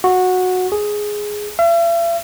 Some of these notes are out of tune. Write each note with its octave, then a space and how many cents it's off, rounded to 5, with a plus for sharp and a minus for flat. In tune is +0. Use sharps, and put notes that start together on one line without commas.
F#4 -10
G#4 +5
E5 +45